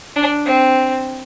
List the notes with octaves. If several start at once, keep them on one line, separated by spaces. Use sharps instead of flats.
D4
C4